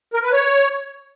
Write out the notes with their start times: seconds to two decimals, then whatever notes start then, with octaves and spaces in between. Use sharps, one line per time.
0.13 A#4
0.23 B4
0.32 C#5